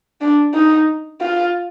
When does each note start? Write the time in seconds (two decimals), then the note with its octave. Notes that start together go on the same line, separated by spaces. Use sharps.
0.21 D4
0.54 D#4
1.21 F4